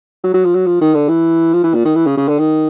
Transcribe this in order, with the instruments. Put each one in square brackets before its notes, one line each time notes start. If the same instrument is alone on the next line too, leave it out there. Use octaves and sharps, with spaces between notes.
[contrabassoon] F#3
F#3
F3
F#3
F3
D#3
D3
E3
F3
E3
A#2
D#3
E3
C#3
C#3
D3
D#3